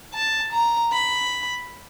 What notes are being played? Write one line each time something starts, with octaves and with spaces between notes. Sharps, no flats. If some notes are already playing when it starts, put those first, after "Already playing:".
A5
A#5
B5